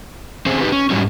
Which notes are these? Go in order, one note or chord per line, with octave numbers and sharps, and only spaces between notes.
C4 C#4 G#4 C5
D#4 F4 G4 B4
C#4
G#2 F#3 G3 C#4